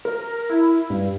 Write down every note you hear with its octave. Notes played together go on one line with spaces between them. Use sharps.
A#4
E4
G2